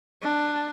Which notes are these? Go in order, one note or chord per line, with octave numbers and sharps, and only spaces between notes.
D4